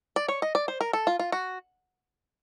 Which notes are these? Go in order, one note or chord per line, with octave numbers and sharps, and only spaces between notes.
D5
C#5
D#5
D5
C5
A#4
A4
F4
F4
F#4